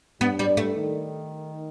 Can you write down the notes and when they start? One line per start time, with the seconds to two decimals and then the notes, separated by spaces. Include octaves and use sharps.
0.20 G2 B3
0.39 G3
0.57 A3
0.74 D#3